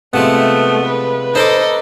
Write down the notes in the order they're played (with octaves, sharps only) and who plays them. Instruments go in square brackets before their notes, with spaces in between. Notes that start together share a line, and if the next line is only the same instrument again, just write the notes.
[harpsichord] C3 F3 G#3 [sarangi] A3 [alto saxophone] B3
[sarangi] B4
[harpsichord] D#4 A5 D6 [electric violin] A4 D#5 [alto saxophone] C5